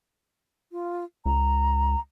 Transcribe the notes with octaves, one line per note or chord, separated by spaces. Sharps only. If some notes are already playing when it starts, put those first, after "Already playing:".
F4
C#2 A#5